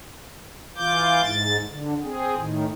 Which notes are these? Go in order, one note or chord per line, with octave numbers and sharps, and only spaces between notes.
E3 F4 D6 G6
G#2 A6
D3
C4 G#4
A2 D#3